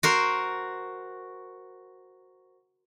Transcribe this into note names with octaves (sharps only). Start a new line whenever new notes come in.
F#4 A#4 C5